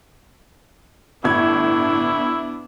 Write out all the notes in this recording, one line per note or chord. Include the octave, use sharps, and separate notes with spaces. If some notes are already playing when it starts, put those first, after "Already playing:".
G1 A2 B3 D4 E4 G#6